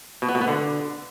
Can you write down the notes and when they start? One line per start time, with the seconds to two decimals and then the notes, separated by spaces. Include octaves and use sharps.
0.22 B2
0.29 B3
0.35 B2
0.41 B3
0.48 D3